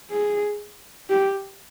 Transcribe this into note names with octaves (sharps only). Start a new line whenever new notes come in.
G#4
G4